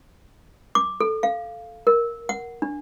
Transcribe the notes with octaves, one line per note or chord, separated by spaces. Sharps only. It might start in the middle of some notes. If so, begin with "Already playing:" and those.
D6
A4
F5
A#4
F#5
D4